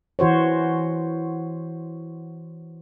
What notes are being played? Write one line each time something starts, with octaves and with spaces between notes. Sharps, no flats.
E3 F#4 C5 C#5